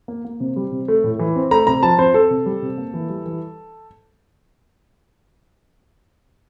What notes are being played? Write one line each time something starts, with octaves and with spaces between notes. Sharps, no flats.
A#3
A#3
C3
G3
C3
A3
A2
E3
C4
A3 A#5
C3 A#5
F3 A5
C4 C5
C4 A4
C3
G3
C3
A#3
E3
G3
E3